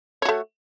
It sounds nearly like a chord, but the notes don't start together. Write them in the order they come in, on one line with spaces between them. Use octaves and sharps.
C#5 F#4 A3